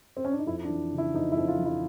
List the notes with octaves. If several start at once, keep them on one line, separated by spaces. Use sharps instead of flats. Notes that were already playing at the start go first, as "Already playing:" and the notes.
C4
C#4
D4
D#4
F2 E4
D4
E3
C#3
E4
F2 D#4
E4
F2
F4
E3
E4